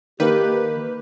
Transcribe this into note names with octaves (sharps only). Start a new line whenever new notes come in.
D#3 A#3 G4 B4